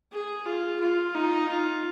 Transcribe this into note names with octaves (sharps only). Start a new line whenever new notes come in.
G#4
F4
F4
D#4
F4